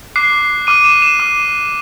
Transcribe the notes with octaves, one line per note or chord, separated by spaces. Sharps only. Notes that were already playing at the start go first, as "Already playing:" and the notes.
D6 F#6 C7
D6 F6 D#7
E7
E7
D6 F6 D#7